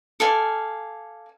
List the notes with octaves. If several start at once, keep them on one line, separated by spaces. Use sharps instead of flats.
A4 D5 F5 G#5